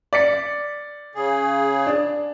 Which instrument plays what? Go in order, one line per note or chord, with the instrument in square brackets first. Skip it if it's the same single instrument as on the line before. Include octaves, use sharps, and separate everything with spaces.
[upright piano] D5 B6 C#7
[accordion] C#3 G#4
[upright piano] D4